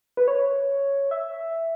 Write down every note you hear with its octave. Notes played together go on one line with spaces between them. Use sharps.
B4
C#5
E5